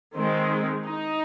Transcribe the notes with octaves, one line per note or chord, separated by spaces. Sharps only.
D#3 G#3 C4
D#4